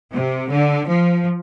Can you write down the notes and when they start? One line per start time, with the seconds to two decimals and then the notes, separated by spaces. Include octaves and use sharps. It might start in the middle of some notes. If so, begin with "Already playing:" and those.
0.14 C3
0.50 D3
0.87 F3